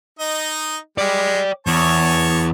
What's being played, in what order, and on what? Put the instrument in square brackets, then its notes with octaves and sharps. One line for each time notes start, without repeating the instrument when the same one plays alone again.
[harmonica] D#4 D#5
[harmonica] G#3 [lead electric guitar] D5 G5
[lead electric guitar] E2 [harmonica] C#5 A5 C#6